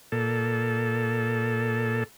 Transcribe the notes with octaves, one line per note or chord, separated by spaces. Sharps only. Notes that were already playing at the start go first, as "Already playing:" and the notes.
A#2 A4